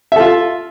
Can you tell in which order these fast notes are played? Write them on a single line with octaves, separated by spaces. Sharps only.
E5 A4 F4